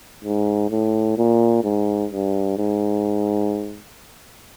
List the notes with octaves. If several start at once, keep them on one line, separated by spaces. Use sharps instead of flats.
G#2
A2
A#2
G#2
G2
G#2